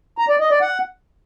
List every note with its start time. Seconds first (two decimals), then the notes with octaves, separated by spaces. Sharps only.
0.18 A#5
0.29 D5
0.40 D#5
0.51 D5
0.61 F#5